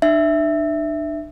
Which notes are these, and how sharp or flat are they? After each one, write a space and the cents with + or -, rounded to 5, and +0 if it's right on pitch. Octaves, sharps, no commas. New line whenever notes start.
D4 +40 E5 +0